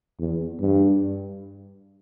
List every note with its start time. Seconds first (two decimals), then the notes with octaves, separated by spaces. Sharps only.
0.19 E2
0.60 G2